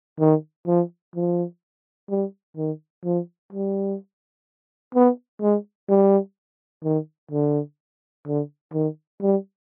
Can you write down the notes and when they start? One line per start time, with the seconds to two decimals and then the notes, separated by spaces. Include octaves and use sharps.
0.20 D#3
0.67 F3
1.15 F3
2.10 G3
2.57 D#3
3.05 F3
3.53 G3
4.95 B3
5.41 G#3
5.89 G3
6.84 D#3
7.31 D3
8.26 D3
8.73 D#3
9.22 G3